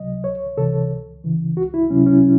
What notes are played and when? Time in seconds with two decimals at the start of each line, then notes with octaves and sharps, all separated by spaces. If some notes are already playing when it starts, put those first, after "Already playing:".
Already playing: C#2 C3 F#3 D#5
0.24 C#2 C#5
0.58 C3 E3 A4
0.91 C#2
1.24 C#3 E3
1.57 C#2 F#4
1.74 E4
1.90 C3 F#3 C#4
2.06 C#4